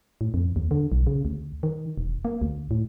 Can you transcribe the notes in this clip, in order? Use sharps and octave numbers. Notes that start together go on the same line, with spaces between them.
A2
F2
D#2
D3
B1
C#3
D2
D#3
E1
A#3
D2
A2